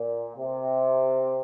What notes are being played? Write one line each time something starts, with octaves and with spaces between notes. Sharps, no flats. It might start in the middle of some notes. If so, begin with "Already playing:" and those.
Already playing: A#2
C3